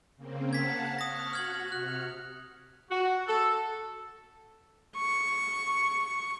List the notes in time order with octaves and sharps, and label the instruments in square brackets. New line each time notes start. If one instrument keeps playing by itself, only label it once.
[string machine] C#3 A#3 C4
[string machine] F5 F#5 A5 [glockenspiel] G#6 B6
[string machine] C#6 F6 F#6 [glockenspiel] D#6 A#6
[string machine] F#4 [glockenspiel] F6 G#6 F#7
[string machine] C3 F6 C#7 [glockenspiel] F#6
[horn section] F#4
A4
[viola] C#6